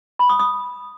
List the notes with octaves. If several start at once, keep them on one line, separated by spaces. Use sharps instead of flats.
B5
D#6
D#6